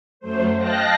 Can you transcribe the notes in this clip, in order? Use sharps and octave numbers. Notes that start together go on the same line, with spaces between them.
F#2 F#3 A3 C5
D#5 F5 G5 A5 F#6 A#6